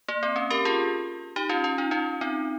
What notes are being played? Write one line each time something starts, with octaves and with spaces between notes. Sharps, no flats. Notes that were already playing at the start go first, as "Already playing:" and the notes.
A#3
C4
C#4
G4 A#4
F4 G#4
D#4 G4
C#4 F4
F4
D#4
C#4 F4
C4 D#4